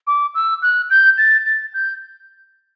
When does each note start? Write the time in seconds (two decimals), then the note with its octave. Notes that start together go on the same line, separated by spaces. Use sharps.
0.07 D6
0.35 E6
0.62 F#6
0.90 G6
1.18 A6
1.46 A6
1.74 G6